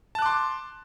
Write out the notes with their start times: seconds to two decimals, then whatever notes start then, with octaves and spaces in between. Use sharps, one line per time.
0.15 A5
0.19 F#6
0.22 D6
0.26 C6